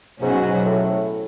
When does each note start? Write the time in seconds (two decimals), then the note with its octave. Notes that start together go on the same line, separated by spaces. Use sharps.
0.22 G#2 B2 F#3 C#4 F#4
0.66 A2